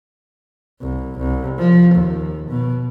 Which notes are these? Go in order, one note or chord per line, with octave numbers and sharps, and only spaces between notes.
C2
C2
F3
D#2
B2